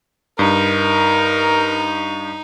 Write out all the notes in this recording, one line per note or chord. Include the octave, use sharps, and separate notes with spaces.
G2 D#4 A#4